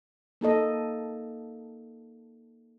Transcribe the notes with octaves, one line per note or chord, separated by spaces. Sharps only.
A#3 D#4 A4 D#5